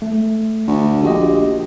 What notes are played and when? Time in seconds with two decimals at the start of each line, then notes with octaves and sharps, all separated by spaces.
0.02 A3
0.67 D2
1.03 A#1 F#4 G4 D#5